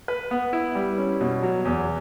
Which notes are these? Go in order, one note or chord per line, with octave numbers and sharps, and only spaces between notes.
B4
B3
E4
G3
C#4
B2
F#3
E2